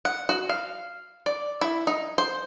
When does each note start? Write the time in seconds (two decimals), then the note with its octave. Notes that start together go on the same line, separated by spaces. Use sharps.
0.05 F#5
0.29 F#4
0.49 F5
1.26 D5
1.61 E4
1.87 D#4
2.18 C5